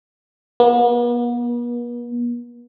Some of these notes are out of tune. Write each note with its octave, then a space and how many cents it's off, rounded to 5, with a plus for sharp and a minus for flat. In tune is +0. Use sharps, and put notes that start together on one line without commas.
B3 -45